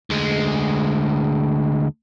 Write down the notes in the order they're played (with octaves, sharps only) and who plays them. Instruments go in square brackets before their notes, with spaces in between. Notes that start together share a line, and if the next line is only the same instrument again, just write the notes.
[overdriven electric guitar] D2 G#3